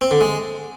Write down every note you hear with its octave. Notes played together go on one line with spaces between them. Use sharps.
C4
D3
G#3